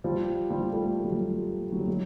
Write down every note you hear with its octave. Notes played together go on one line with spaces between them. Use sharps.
F3 G3
F3 G3
G3 A3
G3
F#3
F3 G3
F#3
G3
F#3 G#3